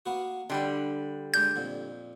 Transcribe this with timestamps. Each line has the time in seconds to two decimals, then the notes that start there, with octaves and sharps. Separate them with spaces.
0.06 A#3 B3 F#4
0.50 D3 G3 B4 C6
1.34 G#3 D4 D5 G6
1.56 F2 A#2